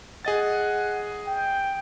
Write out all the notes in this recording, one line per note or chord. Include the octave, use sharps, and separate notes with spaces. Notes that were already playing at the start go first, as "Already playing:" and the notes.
G#4 D#5 F#5 A6
G5